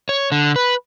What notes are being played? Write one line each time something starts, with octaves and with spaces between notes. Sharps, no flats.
C#5
D3
B4